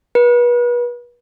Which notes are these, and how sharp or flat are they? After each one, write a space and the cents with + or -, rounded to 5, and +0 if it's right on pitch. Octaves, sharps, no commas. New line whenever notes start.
B4 -35